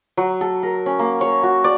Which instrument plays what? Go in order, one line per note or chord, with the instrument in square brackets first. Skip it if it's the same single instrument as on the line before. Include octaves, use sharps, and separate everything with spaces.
[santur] F#3
A4
A#4
C#4
A#3
C#5
F#4
D5